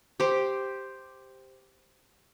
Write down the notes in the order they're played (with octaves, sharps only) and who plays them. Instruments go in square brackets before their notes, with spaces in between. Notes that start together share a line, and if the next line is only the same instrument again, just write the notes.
[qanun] G4 C5